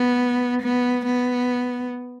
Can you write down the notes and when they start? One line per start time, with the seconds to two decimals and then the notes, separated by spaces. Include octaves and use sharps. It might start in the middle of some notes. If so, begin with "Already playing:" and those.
Already playing: B3
0.63 B3
1.07 B3